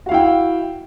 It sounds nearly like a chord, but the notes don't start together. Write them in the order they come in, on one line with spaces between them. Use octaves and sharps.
F#4 F5 E4 G5